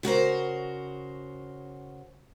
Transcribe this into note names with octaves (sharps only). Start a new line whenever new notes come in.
C#3 F#4 A#4 C5